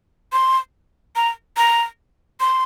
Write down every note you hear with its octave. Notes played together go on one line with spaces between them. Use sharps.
C6
A#5
A#5
C6